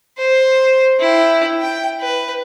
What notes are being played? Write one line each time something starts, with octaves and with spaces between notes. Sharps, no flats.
C5
E4 G5
G5
B4